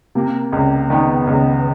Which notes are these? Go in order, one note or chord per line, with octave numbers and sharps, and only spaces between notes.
C3 A#3
C#2
D#3 B3
C#2